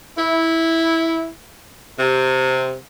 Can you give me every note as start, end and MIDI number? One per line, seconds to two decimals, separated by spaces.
0.16 1.29 64
1.98 2.75 48